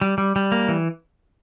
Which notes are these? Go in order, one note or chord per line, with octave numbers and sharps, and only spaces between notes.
G3
G3
G3
A#3
E3